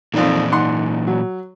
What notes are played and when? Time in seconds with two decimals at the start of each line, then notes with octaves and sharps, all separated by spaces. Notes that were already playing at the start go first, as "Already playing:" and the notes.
0.14 F2 A#2 D#3 E3 D5
0.51 G#2 F#5 C6
1.07 F#3